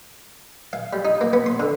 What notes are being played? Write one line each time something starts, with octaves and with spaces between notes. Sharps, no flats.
F5
G3
D#4
A#3
B3
C6
D3